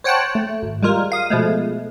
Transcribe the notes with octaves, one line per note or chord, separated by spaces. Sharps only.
C5 C#5 F#5 G5 A5 F#6
A3
G#1
G3 G#3 F4 A#4
F5 D#6
B2 F3 G#3 A3